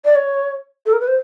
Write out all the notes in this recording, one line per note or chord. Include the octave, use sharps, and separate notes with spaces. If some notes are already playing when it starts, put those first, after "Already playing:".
D5
C#5
A4
A#4
B4
C5